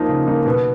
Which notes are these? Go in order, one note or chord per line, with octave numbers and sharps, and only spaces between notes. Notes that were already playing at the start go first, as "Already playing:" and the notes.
Already playing: F3 A#3 D#4
C#3
F3 A#3 D#4
B2